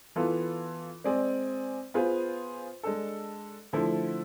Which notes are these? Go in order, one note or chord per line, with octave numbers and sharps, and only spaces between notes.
E3 B3 F4 A4
G#3 C4 G#4 D5
B3 F4 G#4 C5
G#3 D4 A4
D3 F3 A3 E4 A4